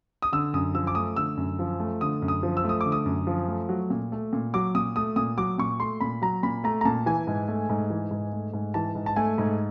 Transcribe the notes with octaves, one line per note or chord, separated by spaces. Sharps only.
D#6
D3 E6
F#2 D#6
F3 E6
D6
A3 D#6
D3 E6
F#2
F3
A3
D3 D#6
F#2
D#6
F3
E6
A3
D#6
D3 D6
D#6
F#2
F3
A3
F#3
A#2
A3
A#2
F#3 D6
A#2 D#6
A3 D#6
A#2 D#6
F#3 D6
A#2 C#6
A3 C6
A#2 B5
F#3 A#5
A#2 B5
A3 A#5
A#5
A#2 A5
E3 G#5
G#2
A3
G#2
E3
G#2
A3
G#2
E3 A5
G#2
A5
A3 G#5
G#2